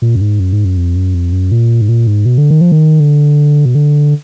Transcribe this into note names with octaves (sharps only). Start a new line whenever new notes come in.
A#2
F#2
G#2
F#2
G#2
F#2
F2
F#2
F2
F#2
A#2
G#2
A#2
G#2
B2
D3
D#3
F3
D#3
D3
B2
D3